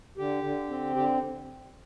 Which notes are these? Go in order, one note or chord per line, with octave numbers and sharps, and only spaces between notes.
D3 G4
D3
C4
D3 G4